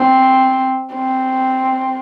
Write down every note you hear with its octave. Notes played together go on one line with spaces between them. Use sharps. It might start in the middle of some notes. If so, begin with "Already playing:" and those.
Already playing: C4
C4